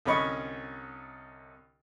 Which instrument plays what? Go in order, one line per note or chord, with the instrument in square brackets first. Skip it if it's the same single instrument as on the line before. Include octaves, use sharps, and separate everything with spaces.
[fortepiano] C2 D3 C#4 D#5 B5 C#6